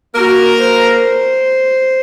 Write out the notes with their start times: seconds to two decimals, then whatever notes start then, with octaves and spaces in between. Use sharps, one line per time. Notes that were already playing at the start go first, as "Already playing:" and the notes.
0.15 A#3 F#4 A#4
0.60 C5